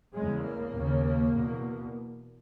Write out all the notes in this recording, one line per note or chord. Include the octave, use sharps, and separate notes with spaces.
E2 C#3 G#3
A#3
D#2 C#3
E2 B2